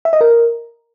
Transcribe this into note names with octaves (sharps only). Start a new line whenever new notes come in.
E5
D#5
A#4